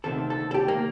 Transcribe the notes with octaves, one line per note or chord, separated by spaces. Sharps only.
D2 C3 D#3 A4
A4
A4
G4
A#3